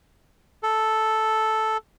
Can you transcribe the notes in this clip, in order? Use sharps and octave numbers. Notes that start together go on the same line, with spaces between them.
A4